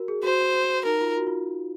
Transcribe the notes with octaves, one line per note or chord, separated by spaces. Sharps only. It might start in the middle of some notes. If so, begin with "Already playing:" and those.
Already playing: F#4 A#4
G#4
F#4 C5
D#4 A#4
F4
F#4
F4